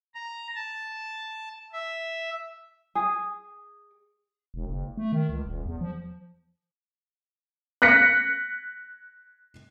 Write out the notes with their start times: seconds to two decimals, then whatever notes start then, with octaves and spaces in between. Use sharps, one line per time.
0.15 A#5
0.55 A5
1.73 E5
2.95 G#4
4.54 E1
4.67 F#1
4.97 A3
5.12 D#3
5.29 C#2
5.45 D#1
5.66 E2
5.81 F3
7.82 F#6 A#6 B6 C#7